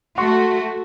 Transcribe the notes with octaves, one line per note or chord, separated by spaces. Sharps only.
A3 F#4 F#5 C6 C#6